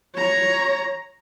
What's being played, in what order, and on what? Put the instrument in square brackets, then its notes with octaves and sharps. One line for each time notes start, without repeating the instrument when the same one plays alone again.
[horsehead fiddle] C#5 A#5